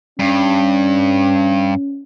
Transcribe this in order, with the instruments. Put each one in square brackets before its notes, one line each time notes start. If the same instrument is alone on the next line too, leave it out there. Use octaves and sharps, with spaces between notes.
[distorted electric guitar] G2 [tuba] C#4